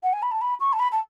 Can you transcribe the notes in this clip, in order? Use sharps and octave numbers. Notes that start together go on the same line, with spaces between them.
F#5
G#5
B5
A5
B5
C#6
A5
B5
A5